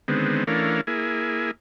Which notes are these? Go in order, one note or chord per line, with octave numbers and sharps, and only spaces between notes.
D3 D#3 G#3 B3 C4
E3 A3 C#4 D4 A#4 F5
A#3 E4 G#4